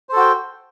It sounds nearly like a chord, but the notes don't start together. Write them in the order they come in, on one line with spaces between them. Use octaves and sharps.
C5 A4 F#4 G5